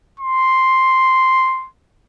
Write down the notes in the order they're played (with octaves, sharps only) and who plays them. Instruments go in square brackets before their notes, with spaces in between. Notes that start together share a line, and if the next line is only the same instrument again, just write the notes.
[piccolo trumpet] C6